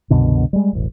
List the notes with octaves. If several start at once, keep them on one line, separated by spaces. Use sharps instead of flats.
C2 F#2 B2 D3
G3 G#3
E1 A1